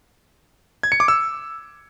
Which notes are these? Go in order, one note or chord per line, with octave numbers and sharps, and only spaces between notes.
G#6
C#7
D6
E6